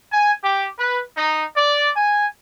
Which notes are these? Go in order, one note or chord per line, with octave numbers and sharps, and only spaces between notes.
G#5
G4
B4
D#4
D5
G#5